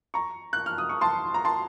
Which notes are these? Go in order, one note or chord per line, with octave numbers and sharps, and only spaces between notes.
A#5 C#6
F#6
F6
D#6
C#6
A5 C6
A#5
A5 C6